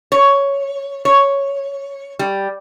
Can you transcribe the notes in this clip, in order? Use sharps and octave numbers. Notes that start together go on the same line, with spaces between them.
C#5
C#5
G3